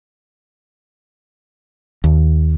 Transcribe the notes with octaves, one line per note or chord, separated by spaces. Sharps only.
D#2